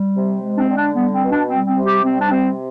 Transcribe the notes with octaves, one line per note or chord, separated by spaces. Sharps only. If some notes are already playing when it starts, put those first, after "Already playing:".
Already playing: G3
C3
G#3
D4
C4
D3
D4
G3 B3
C4
B2
D4
G3 C4
C4
C3
G4
G3 C4
D4
C3 C4